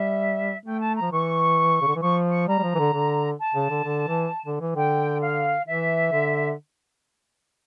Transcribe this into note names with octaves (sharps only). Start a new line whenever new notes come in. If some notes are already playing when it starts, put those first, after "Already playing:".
Already playing: G3 E5
A3 G5
A5
A#5
F3
E3 C#6
C#3
D3
E3
F3 C#6
C#6
G3 A#5
G3
F3
E3
D3
D3
A5
C#3
D3
D3
E3
D3
E3
D3 G5
F5
E3 E5
D3